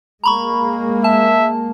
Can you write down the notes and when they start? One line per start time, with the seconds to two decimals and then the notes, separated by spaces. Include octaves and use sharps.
0.24 G#3 A#3 A#5 B5 C#6
1.04 E5 A5